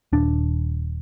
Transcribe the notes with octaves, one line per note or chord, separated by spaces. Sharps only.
D#1 D4